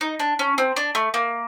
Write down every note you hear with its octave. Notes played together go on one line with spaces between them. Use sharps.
D#4
D4
C#4
C4
D4
A3
A#3